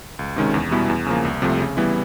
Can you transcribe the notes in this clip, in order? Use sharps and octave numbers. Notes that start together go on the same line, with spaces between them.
C#2
C3 D#3 G#3 C#4
E2
B2 G3 B3 E4
E2
C#3 F3 A#3
C2
C3 F3 A3
C#3
E3 G3 B3 E4